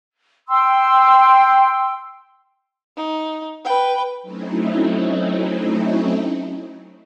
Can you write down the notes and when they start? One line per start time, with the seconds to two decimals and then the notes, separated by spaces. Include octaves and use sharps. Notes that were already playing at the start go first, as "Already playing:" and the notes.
0.49 G5 C6 E6
2.97 D#4
3.65 B4 G5
4.22 F#3 A3 C4 C#4 D#4 E4